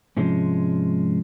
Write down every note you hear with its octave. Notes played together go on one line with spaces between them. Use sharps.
G#2 C3 F3 G#3 C#4